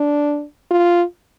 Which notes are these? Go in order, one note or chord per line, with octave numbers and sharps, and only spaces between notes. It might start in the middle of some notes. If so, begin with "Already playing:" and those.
Already playing: D4
F4